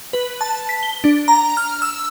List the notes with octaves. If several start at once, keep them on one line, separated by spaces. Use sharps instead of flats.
B4
A5
B6
G7
D4
A#5
F6
E6